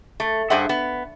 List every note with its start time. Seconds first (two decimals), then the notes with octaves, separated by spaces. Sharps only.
0.20 A3
0.50 G2 G#4 C5 E5 F#5
0.69 B3